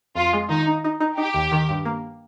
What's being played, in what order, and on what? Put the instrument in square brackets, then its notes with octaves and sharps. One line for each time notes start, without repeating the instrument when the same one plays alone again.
[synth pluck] F2 [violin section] F4
[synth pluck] G#3
[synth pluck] D#3 [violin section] D#4
[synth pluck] D#4
D#4
D#4
[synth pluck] D#4 [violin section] G4
[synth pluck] D#2
D#3
G2
A#3